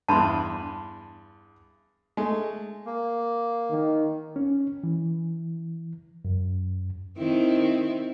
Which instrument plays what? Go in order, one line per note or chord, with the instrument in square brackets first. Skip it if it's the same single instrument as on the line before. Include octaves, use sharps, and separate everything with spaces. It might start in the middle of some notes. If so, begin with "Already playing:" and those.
[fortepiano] E2 G2 [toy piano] A5 B5 C6
[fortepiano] G#3 A3
[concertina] A#3
[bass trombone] D#3
[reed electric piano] C#4
E3
F#2
[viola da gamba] D#3 C4 E4